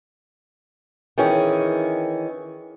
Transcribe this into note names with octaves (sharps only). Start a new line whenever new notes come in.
D#3 E3 C#4 G#4